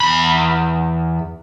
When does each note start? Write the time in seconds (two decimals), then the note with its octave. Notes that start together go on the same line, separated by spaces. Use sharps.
0.01 E2 B5